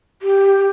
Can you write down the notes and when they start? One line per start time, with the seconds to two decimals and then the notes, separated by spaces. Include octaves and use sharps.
0.22 G4